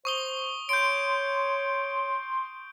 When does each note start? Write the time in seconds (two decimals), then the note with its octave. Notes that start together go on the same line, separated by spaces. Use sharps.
0.05 C5 C#6 D#6 G7
0.69 C#5 C6 G6 D7